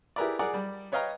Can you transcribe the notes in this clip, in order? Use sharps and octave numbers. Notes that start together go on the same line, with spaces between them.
E4 G4 G#4 A#4 B4 D5
G#4 A#4 D5 F#5
G3
B4 C#5 D#5 F5 G5 A#5